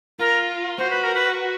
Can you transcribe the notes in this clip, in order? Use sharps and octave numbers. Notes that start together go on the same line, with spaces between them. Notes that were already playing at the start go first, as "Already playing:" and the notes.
F4 A#4
F#4 C5
B4
A#4
B4